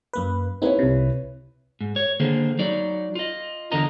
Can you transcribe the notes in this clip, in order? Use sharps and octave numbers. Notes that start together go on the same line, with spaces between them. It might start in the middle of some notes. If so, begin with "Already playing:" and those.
F#2 A#3 B4
A#3 C4 D#4 E4 B4 C#5
C2 C3
G#2
C#5
D3 D#3 A#3 G#4 C5
F#3 D#4 D5
F4 D#5
E2 D3 A#4 D#5 A#5